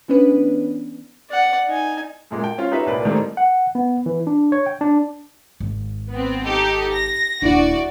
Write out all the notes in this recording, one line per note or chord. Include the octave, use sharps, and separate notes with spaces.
E3 B3 C#4 D4 B4
D5 F#5
D#4 G#5
F#2 A#2 G#3
G5
C#4 F4
D#4 G4 B4 C#5 E5
C2 A#2 B4 D5 B5
A2 D#3 G3 A3 A#3 C4
F#5
B3
E3
D4
C#5
G5
D4
G#1
B3 C4
D#4 G4 A4
A#6
D#1 D4 E4 F#4 D5